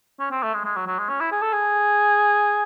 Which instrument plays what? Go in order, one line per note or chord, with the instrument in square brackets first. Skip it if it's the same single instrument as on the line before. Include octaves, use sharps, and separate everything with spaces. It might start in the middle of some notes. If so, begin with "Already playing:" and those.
[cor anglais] C#4
C4
A3
G#3
G#3
F#3
F#3
G#3
C#4
E4
G#4
A4
G#4